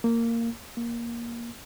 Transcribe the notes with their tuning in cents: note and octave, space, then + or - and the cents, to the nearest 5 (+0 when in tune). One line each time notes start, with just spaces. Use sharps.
A#3 -15
A#3 +10